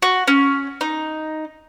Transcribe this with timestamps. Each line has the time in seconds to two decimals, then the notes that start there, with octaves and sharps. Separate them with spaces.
0.02 F#4
0.27 C#4
0.81 D#4